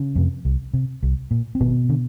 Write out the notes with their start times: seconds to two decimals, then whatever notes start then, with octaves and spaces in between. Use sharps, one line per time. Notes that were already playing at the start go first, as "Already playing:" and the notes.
Already playing: C#3 C#4
0.15 F2 C3
0.45 C2
0.74 C3
1.03 C2
1.31 A#2
1.55 C4
1.60 G#1 B2 B3
1.89 D3